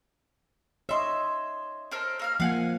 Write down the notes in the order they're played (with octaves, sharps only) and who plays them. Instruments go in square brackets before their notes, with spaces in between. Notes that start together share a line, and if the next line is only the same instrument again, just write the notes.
[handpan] C#5 D#5 [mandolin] E5 C6
[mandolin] A4 A#4 C5
A#3 F5 F6
[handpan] F3 A#3 [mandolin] F5 F#5 G#5